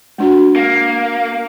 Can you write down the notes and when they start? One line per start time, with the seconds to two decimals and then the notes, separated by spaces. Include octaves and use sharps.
0.18 G#3 D4 F#4
0.56 A#3